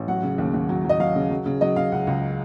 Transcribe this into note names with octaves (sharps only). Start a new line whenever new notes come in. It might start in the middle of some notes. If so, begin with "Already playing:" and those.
Already playing: A1
F#3 F#5
C#3
D#2
D#2
F#3
F#3 D#5
F#3 F5
C#3
F#3
C#3
F#3 D#5
C#3 F5
C#2 F#5
C#2